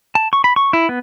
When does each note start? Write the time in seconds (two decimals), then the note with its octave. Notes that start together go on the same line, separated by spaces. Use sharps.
0.15 A5
0.33 C#6
0.44 B5
0.56 C#6
0.73 E4
0.89 B3